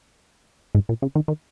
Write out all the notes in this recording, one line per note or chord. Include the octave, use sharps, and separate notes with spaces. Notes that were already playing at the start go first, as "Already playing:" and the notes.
G#2
A#2
C#3
D#3
D#3